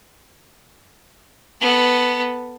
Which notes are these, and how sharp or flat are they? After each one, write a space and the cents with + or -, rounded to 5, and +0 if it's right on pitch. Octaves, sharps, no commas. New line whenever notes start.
B3 +0 A4 +5